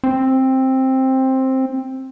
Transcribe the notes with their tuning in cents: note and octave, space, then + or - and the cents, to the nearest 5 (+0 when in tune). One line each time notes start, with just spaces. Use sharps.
C4 +10